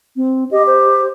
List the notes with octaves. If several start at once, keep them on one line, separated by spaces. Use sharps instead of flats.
C4
G4 D#5
C5